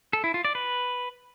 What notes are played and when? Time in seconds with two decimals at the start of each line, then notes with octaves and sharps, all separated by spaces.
0.13 A4
0.24 E4
0.34 F4
0.45 D5
0.55 B4